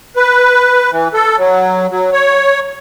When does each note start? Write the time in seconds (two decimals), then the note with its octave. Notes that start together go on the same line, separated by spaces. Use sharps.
0.16 B4
0.91 E3
1.14 A4
1.38 F#3
1.90 F#3
2.13 C#5